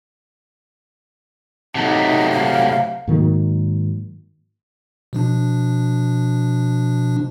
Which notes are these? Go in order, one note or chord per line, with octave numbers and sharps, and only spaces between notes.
C3 F#3 A3 D#4
F5
G#2 D#3 F#3 A#3
B2 F3 D4